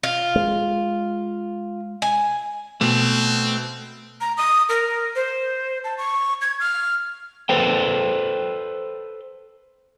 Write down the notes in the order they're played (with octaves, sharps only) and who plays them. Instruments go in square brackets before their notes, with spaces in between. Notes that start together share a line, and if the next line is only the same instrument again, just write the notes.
[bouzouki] F4
[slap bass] G#3
[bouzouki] G#5
[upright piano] B2 [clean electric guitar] A3 [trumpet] C4
[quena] A#5
D#6
A#4
C5
A5
C#6
G#6
F6
[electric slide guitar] A4 B4 C5 G5